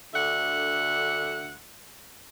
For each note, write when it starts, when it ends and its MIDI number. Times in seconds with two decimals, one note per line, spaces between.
0.14 1.57 38
0.14 1.57 50
0.14 1.57 76
0.14 1.57 78